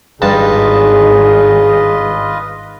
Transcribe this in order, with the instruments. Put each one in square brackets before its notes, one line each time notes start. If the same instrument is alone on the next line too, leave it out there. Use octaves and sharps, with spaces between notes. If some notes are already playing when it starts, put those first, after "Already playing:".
[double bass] G#1 D#3 [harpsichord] G2 A5 [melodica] F4 B4 D#5 [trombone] G#4